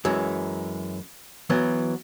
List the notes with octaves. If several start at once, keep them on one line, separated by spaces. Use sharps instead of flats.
F#2 E3 G#3
E3 F#3 B3